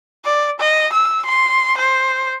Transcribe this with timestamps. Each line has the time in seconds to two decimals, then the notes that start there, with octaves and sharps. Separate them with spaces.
0.25 D5
0.60 D#5
0.93 E6
1.25 C6
1.78 C5